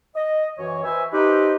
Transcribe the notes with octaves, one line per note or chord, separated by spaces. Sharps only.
D#5
F#2 E3 C#5
B4 C5 E5 G#5
D#4 G4 B4 C5